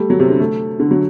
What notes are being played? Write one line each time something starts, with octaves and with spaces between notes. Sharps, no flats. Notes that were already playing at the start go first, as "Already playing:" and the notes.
Already playing: G3 A3
F#3
C3
D3
A3
D3
F#3